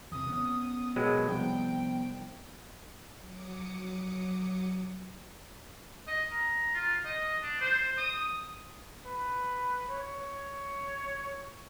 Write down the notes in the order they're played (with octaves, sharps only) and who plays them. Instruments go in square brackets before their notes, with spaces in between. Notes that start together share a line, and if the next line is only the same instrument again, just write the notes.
[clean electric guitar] E2 C3 [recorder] D#6
[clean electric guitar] B3 C#4
[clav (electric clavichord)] B2 F#3 G#3 [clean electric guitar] A#4 G5
[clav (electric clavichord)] C2 [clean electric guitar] F3 B3 D4 [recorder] G5
[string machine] F#3 D6 D#6 C#7
[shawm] D#5
A#5
F4
D#5
D4
C5
D#6
[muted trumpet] B4
C#5